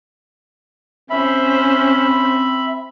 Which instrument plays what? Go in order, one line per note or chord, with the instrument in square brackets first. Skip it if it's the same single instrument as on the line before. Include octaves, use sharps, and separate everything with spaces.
[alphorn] C4 [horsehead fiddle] C#4 C5 [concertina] E5 B5